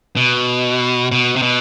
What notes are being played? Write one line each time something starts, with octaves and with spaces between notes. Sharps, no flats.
B2
B2
C3
B2